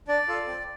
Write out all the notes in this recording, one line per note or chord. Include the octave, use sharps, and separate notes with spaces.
D4 D5
F4 A4
C4